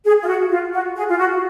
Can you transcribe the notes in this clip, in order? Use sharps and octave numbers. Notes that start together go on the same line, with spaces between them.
G#4
F4
F#4
F4
F#4
G#4
F4
F#4